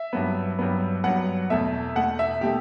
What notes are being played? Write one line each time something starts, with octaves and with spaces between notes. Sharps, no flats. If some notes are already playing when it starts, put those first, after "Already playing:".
Already playing: E5
G2 F#3 B3
G2 F#3 B3
G2 F#3 B3 F#5
E2 B2 A3 E5
E2 B2 A3 F#5
E5
B2 A3 G4